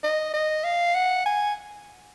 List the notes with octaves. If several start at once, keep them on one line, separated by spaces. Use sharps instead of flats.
D#5
D#5
F5
F#5
G#5